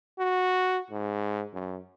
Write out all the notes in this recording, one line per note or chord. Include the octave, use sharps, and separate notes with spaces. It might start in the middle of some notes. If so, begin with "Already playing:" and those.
F#4
G#2
F#2